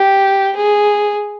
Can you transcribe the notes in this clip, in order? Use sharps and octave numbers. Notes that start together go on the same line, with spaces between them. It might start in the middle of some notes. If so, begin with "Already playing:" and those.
Already playing: G4
G#4